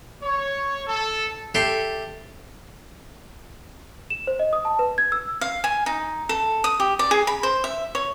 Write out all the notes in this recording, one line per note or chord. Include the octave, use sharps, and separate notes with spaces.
C#5
A4
G4 A4 E5 C6
E7
C5
D#5
D#6
A5
B4
G#6
E6
F5
G#5
D#4
A4
D#6
G4
D5
G#4
B5
C5
E5
C#5